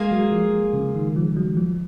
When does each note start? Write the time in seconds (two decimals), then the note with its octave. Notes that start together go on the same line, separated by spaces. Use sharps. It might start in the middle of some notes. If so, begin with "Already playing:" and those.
Already playing: G#3 A#3 F4 G#4
0.11 F#3
0.32 F3
0.73 C#3
0.95 D#3
1.16 F3
1.36 F#3
1.57 F3